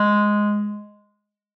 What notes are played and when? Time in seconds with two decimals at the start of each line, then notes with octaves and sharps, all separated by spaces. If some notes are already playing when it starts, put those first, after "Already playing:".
Already playing: G#3